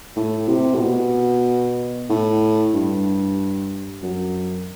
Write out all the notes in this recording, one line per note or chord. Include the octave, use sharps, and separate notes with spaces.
A2
C3
A2
B2
A2
G2
F#2